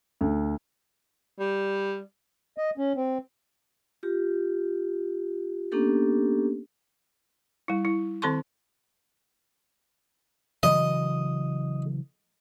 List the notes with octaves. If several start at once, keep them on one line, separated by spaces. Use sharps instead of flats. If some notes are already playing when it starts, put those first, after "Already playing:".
D2
G3
D#5
C#4
C4
F4 G4
A#3 B3 C#4 D4 G4 A4
G3 E4
E4
D#3 C4 A4 A5 C6 C#6
C#3 E3 F#3 D#5